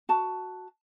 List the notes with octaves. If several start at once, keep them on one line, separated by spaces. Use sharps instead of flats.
F#4 A5